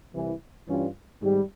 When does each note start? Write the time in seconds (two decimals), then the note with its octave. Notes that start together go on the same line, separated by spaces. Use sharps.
0.14 C2 C3 E3
0.68 G2 E3 G3 C#4 F4
1.22 G#1 G#2 G3